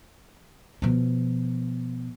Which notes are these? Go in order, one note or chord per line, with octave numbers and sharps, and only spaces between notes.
B2 F3